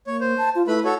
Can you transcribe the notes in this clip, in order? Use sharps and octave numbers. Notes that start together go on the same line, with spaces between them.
A#3 C#5
C5
A5
F4
A3 E4 B4 B5
F#4 A4 C#5